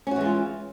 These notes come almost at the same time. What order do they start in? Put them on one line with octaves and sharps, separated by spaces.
C#4 F#4 E3 G#3 F4